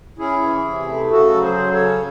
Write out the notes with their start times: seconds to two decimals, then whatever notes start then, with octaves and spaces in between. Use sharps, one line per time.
0.18 C#4 E4 G#4
0.42 E3
0.65 C3
0.88 A3
1.11 C#3 F#4 A4
1.34 F#3
1.42 G#4 C5
1.58 C#3
1.73 A4 C#5
1.80 C#4